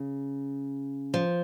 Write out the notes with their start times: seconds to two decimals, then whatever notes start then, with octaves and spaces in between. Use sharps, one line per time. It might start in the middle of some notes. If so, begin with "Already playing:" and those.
Already playing: C#3
1.14 F3